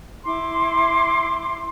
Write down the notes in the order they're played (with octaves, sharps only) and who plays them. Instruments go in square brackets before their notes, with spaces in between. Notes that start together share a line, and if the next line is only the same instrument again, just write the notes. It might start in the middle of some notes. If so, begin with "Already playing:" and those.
[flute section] E4 C6 D6